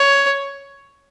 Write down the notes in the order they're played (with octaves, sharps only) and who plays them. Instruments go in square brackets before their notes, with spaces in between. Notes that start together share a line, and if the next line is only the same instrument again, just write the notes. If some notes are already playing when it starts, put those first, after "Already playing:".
Already playing: [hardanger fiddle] C#5